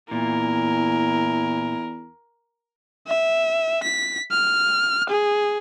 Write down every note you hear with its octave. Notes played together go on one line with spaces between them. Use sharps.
E2 A#2 E4 A#4
E5
B6
F6
G#4